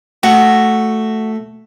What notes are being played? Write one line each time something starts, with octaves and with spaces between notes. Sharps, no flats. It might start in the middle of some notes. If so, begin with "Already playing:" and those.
A3 F#4